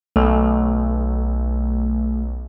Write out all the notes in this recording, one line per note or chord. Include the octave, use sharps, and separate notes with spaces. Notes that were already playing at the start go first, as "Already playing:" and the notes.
B1 A3